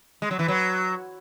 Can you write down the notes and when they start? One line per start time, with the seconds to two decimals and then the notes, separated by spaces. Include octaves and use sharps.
0.22 G#3
0.31 F#3
0.39 E3
0.48 F#3